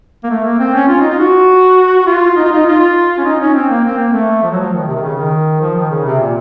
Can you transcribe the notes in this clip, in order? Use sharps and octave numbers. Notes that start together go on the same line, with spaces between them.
A#3
A3
A#3
C4
C#4
F4
D#4
F4
F#4
F#4
F4
D#4
F4
D#4
F4
C#4
D#4
C#4
C4
A#3
C4
A#3
A3
F3
F#3
F3
D#3
C3
D#3
C#3
D#3
F3
D#3
C#3
C3
A#2